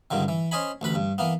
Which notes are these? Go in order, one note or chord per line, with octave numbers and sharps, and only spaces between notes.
C#2 G2 D3 D#3
E3
C#4 C5 D#5 G#5 B5
A1 D2 B4 B5
G2
E3 A#3 B3